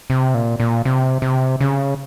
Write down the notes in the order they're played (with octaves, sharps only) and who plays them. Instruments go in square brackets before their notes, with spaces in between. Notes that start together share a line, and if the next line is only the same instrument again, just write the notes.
[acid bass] C3
A#2
A#2
C3
C3
C#3